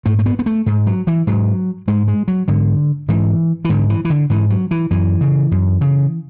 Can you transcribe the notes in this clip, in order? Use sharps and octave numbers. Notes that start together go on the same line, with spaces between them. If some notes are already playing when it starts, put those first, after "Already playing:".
G#2 A3
A3
B3
B3
A3
G#2
F#3
E3
G#2 F#3
G#2 G#3
G#3
F#3
G#2 D3
G#2 E3
E3
G#2 D3
E3
E3
D3
G#2 E3
F#3
E3
F#2 E3
C#3
F#2
C#3